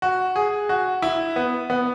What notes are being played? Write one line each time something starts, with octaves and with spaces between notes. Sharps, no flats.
F#4
G#4
F#4
E4
B3
B3